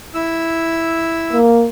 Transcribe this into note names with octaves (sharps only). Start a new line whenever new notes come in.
E4 E6
A#3